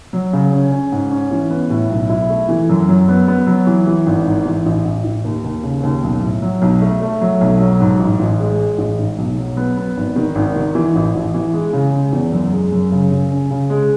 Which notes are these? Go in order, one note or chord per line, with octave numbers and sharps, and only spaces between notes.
F#3
C#3
C#4
C#4
G#2
C#4
E3
B3
A2
B1
E4
A3
E3
F#2
F#3
B3
B3
F#3
E3
E3
G#1
G#2
E3
A1
A1
A1
D#2
D#2
C#3
D#2
B1
A2
F#3
B1
A3
A3
F#3
B1
F#3
G#2
A1
A1
G#3
G#3
A1
G#2
B1
F#3
B3
B3
G#1
D#3
G#1
D#3
E3
A1
A1
E3
G#3
C#3
G#3
E2
F#2
G#3
F#2
C#3
C#3
C#4
C#3
G#3